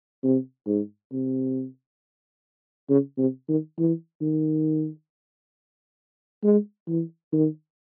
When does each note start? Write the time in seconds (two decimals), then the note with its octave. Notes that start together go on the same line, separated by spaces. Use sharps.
0.23 C3
0.67 G#2
1.12 C3
2.90 C#3
3.18 C3
3.49 D#3
3.78 E3
4.21 D#3
6.43 G#3
6.88 E3
7.33 D#3